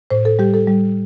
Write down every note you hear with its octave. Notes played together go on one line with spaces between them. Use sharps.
A2 C5
A4
G3 G4
A4
G3